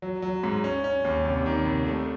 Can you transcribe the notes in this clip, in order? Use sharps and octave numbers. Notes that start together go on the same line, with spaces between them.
F#3
F#3
G#2
C#4
C#4
D#2
C2
D#3
C2
A3